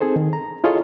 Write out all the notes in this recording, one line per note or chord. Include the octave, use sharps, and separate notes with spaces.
C4 D#4 G#4 A4 C5
D#3
A#5
E4 F4 G#4 A4 C#5 D#5